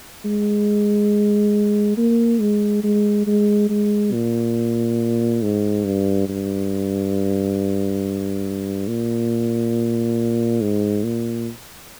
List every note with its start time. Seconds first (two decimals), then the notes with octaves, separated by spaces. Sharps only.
0.25 G#3
1.97 A#3
2.41 G#3
2.84 G#3
3.27 G#3
3.70 G#3
4.13 A#2
5.42 G#2
5.86 G2
6.29 G2
8.88 A#2
10.61 G#2
11.04 A#2